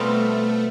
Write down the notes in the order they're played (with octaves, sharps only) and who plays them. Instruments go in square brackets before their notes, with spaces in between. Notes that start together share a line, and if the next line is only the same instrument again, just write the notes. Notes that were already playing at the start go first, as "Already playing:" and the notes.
Already playing: [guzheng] B2 G3 C4 F4 [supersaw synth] A3